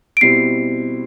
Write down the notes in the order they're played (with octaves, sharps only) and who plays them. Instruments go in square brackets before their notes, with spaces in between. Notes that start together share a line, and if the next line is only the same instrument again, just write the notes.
[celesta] D7
[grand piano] B2 G3 C4 E4 [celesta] C7